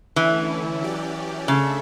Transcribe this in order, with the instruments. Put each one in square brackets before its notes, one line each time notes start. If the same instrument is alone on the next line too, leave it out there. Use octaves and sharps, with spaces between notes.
[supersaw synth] D3 A3 C#4 E4 [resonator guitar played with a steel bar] E3
[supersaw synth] F#3 C#4 G4 D5
[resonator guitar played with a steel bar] C#3 [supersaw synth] A3 D4 A4 E5